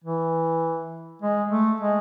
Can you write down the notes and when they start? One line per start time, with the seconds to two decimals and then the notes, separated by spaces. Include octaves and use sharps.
0.04 E3
1.22 G#3
1.51 A3
1.80 G#3